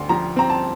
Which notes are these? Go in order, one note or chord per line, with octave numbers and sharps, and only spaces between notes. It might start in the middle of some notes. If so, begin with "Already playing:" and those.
Already playing: D2 D3 C6
F3 A#5
C4 A#5
A5